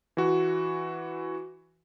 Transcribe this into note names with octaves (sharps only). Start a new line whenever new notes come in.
E3 F#4